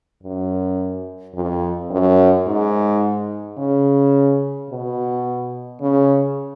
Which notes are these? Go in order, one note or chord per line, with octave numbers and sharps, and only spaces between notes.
F#2
F2
F#2
G#2
C#3
B2
C#3